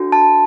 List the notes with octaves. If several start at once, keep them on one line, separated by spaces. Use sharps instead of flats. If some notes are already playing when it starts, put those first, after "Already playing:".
Already playing: D4 F#4 A4
A5